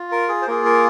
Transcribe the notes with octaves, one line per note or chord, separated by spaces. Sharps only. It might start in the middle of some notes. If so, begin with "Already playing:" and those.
Already playing: F4
A#4
G#4
C5
A#3 F4 G#4 A#4
A#4